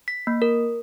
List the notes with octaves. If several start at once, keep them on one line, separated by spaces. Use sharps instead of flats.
B6
A#3
A#4